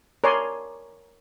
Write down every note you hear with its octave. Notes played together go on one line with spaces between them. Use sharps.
A#4 C#5 D5 G#5 C6